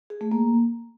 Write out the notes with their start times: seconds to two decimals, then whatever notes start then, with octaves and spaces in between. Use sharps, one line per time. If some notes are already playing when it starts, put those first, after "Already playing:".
0.10 G#4
0.21 A3
0.31 A#3